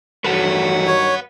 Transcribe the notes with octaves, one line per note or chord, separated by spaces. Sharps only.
E2 G2 D#3 F#3 A3 B4 F#5
C#5